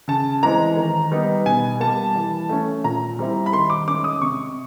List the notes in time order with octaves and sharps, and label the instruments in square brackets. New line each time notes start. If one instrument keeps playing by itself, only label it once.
[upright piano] C#3 A5
E3 G#3 C4 A#5
D#3
G3 B3 D#4
B2 G#5
G3 A#3 A5
E3
A3 C#4
A#2 A#5
G3 C4 E4
B5
D#3 C6
D6
G#3 C#4 D6
D#6
C3 C#6